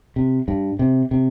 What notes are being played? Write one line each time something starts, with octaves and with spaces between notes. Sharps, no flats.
C3
G2
C3
C3